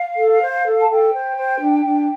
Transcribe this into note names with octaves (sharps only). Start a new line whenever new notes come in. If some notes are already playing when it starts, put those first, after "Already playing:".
Already playing: F5
A4
C5
A4
A5
A4 G5
C5
C5
D4
D4